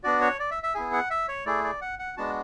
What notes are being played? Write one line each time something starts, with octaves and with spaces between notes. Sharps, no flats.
B3 D4 F#4 D5
C#5
D5
E5
E5
B3 E4 G#4 G#5
F#5
E5
C#5
A3 E4 G#4 D5
D5
F#5
F#5
G#3 B3 D4 F#4 A5